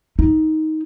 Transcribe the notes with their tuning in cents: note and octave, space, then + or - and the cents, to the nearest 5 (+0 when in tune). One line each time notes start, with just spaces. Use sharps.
D#4 +10